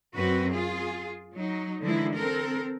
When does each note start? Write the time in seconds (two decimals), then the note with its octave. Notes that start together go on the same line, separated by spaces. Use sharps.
0.15 F#2 C4 F#4 B4
0.52 F4 G#4
1.36 F#3 D#4
1.82 D3 E3 F3 G#3 D#4 E4
2.16 C4 A4 A#4